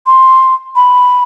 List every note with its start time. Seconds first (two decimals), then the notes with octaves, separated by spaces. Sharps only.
0.06 C6
0.76 B5